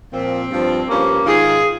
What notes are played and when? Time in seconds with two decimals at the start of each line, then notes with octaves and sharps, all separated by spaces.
0.12 A#2 F3 C4
0.50 G2 F3
0.88 G2 F3 A#3 C#4
1.26 G#2 D#3 F4 G#4